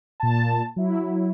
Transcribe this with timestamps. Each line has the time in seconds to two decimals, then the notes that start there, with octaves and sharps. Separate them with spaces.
0.20 A#2 A5
0.76 F#3 E4